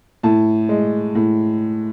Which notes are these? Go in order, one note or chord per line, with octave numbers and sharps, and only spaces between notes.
A2 A5
G#3
A2